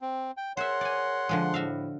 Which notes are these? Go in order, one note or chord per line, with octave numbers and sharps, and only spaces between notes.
C4
G5
G#4 A#4 C5 C#5 E5 F#5 C6
D5 G#5
D3 F3 G#3
A2 F#4 E5 F5